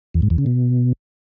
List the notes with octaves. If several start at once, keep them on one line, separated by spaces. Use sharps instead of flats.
E2
G#2
E2
C#3
B2